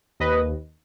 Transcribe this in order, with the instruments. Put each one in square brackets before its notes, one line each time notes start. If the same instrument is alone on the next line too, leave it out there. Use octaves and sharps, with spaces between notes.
[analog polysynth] D#2 B4 D#5